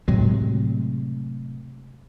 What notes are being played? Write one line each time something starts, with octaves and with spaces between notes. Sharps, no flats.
A2 C3 F#3 G#3